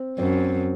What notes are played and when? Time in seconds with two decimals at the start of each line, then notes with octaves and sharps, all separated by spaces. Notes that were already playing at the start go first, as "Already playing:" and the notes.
Already playing: C4
0.18 F#2 C4